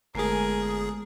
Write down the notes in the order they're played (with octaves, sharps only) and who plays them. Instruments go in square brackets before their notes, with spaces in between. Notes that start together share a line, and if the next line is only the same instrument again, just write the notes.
[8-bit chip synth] G1 G#4 [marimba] G#3 A3 [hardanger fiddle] A#4 G#5